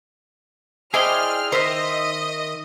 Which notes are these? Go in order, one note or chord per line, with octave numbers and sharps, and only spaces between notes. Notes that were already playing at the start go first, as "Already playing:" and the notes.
E4 G#4 C5 D5 D#5 G5 F6
D#3 C5 D#5 E5 F6